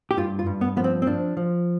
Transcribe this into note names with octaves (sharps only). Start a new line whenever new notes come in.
G4
G2 F4
F4
G2
B3
F3 B3
C4
C4
F3 D4
F3